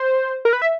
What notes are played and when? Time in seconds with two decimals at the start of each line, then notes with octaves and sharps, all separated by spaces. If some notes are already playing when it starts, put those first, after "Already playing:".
Already playing: C5
0.45 A#4
0.53 B4
0.62 E5